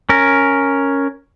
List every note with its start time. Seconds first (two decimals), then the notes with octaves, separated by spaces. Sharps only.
0.09 C#4 A#4